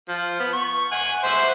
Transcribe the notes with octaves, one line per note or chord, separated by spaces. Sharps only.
F3
B3
C#6
F#5 G#5
C5 E5 F#5